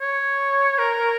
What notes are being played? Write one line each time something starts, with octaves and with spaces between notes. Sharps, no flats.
C#5
A#4